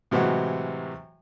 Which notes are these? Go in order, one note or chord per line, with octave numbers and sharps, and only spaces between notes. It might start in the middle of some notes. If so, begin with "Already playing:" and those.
A2 C3 E3 F#3 G#3 F#4